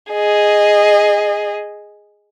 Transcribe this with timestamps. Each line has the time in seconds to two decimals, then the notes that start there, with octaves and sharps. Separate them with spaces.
0.13 G#4 D#5